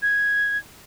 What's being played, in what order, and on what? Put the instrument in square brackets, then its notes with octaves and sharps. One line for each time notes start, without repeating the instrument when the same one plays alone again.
[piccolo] G#6